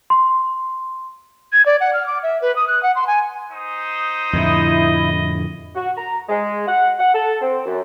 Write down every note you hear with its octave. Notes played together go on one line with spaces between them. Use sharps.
C6
G#6
D5
F#5
F6
D6
E5
B4
D#6
F#6
F#5
C6
G#5
D#4 C5 D#6
F2 A2 D3 E4 D#5
F#4
A#5
G#3
F#5
F#5
A4
C4
F#2